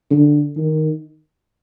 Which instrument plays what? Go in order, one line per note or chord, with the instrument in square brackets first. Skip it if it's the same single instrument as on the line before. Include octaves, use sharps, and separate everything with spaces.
[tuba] D3
D#3